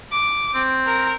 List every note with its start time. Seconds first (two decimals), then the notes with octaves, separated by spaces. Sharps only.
0.11 D6
0.54 C4
0.86 A#4